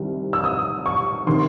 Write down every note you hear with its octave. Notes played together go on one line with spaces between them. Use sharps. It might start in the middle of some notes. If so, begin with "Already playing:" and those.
Already playing: C2 C3 D#3
E6
D#6
C#6
C3 D#3 C6